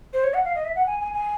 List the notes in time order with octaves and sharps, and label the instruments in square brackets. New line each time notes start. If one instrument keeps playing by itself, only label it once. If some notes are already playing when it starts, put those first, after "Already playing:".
[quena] C5
C#5
F#5
F5
D#5
E5
F#5
G#5
G#5
G#5